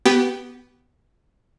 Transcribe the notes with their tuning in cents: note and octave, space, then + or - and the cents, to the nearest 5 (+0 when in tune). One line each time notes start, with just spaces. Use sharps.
B3 +0 G4 -30 G5 +0